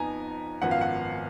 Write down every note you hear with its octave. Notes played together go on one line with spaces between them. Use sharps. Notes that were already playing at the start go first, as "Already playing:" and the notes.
Already playing: F2 F3 B3 D#4 G#5 A#5
G#1 F#2 F3 B3 F#5
F5
F#5